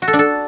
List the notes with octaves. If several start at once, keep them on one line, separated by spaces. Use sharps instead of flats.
F#4
A4
D4
A4